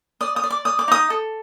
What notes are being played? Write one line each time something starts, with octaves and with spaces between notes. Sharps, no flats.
D5 D#6
D#6
D5
D6
D5 D#6
D6
D#4 D#6
A4